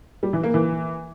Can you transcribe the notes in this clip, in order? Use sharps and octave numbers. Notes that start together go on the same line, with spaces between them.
G3
E3
A#3
E3